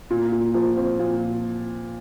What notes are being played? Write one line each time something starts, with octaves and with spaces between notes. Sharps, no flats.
A#2
A#2
F3
C4
A#2